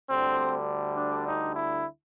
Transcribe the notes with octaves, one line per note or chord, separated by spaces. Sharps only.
D2 D3 G3 C4
D4
D#4
E4